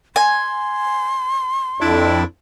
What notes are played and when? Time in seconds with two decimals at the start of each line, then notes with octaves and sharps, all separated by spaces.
0.16 G#5 C6
1.81 F2 D4 E4